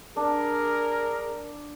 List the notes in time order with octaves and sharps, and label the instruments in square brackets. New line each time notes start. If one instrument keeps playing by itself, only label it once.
[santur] D4 [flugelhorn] G#4 [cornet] A#4